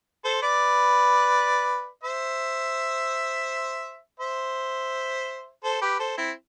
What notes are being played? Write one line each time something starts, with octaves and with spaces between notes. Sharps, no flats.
A4 C5
B4 D5
C5 E5
C5 E5
A4 C5
G4 B4
A4 C5
C4 E4